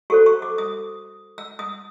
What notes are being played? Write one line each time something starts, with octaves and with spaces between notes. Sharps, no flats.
F#4 A4 C5 C#6
C#6
D6
D#6
E6
D#6